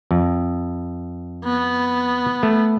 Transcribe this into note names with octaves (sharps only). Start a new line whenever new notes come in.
F2
B3
A3